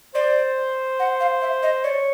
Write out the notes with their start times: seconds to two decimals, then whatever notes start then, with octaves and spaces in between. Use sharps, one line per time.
0.15 C5 D5
1.00 F#5
1.20 F5
1.42 E5
1.63 D#5
1.84 C#5 D5